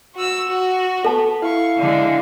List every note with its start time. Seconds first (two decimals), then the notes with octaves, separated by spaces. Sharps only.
0.14 F#4 E6
0.47 F#4
1.05 B3 A4 A5
1.42 E4 F5 C#6
1.78 D3 G#3